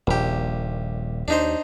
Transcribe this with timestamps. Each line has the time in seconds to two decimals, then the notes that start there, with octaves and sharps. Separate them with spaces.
0.07 D#1 A#1 G4
1.28 D#2 D4 D#4 C5